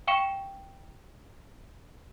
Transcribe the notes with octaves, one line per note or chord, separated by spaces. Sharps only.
F5 G5 C#6 C#7 E7